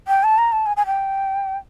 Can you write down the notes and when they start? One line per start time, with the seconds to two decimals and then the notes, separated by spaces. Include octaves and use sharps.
0.08 G5
0.24 A5
0.38 A#5
0.52 A5
0.66 G#5
0.77 G#5
0.86 G5